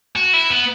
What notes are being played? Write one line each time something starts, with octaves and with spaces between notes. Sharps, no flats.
F#4
E4
B3